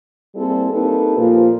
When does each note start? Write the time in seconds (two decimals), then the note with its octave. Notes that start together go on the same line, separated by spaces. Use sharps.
0.35 G3 A#3 C4 E4 G#4 A4
0.70 A#3 C4 D#4 G4 A4 B4
1.17 A#2 F3 A#3